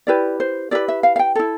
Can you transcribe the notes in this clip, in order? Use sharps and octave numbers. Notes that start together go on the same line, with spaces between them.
E4 G4 B4 D5
C5
E4 G4 B4 D5
E5
F5
F5
G5
E4 A4